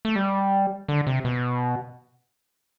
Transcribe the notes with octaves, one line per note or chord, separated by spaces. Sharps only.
A3
G3
D3
C3
B2